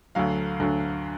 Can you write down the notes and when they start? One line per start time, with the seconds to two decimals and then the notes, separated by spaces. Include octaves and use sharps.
0.15 D2 D3 F#3 F5
0.60 D2 D3 F#3